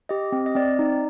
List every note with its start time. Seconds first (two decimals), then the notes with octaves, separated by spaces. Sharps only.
0.09 G4 D#5
0.32 C4
0.46 D#5
0.55 C4 D5
0.79 D#4